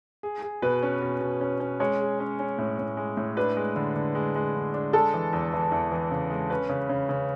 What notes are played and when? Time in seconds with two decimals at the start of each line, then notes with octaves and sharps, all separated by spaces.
0.23 G#4
0.42 G#4
0.62 B2 B4
0.83 C#4
1.02 B2
1.21 B2
1.41 C#4
1.60 C#4
1.80 G#3 C#5
2.00 G#4
2.20 C#4
2.39 C#4
2.58 A2
2.79 A2
2.97 G#3
3.17 A2
3.37 D4 B4
3.57 G#3
3.76 D3
3.96 D3
4.15 G#3
4.35 G#3
4.55 D3
4.74 D4
4.93 G#3 A4
5.14 E3
5.33 E2
5.53 E3
5.72 E2
5.92 E3
6.11 C#3
6.30 G#3
6.50 C#4 B4
6.69 C#3
6.89 C#3
7.09 C#3